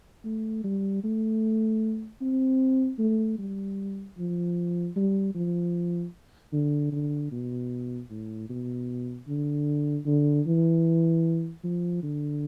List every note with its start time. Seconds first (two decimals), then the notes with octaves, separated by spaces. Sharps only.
0.24 A3
0.64 G3
1.04 A3
2.21 C4
2.99 A3
3.38 G3
4.18 F3
4.96 G3
5.35 F3
6.53 D3
6.92 D3
7.32 B2
8.10 A2
8.50 B2
9.28 D3
10.06 D3
10.46 E3
11.64 F3
12.03 D3